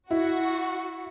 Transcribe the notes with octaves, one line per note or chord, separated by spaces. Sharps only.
E4 F#4